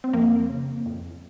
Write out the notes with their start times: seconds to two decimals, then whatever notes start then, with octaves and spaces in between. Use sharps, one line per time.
0.04 C4
0.13 F2 A#3
0.49 C#3
0.86 F2